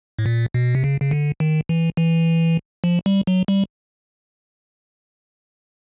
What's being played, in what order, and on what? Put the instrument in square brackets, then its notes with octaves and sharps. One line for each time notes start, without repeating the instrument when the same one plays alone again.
[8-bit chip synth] A2
A#2
B2
C3
C#3
C#3
D3
D#3
E3
E3
F3
G3
F#3
G3